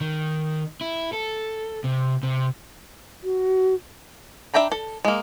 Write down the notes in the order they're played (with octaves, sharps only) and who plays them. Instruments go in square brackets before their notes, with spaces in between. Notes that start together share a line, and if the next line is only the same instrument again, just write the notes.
[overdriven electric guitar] D#3
E4
A4
C3
C3
[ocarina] F#4
[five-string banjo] D4 E5 G5 A#5 B5
A4
G#3 A#3